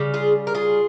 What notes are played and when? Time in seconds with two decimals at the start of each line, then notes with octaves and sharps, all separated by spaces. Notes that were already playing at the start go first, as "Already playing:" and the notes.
Already playing: C#3 G3
0.14 F4 G#4
0.47 A#4
0.54 F4 G#4